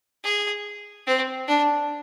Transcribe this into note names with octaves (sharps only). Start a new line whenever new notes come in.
G#4
C4
D4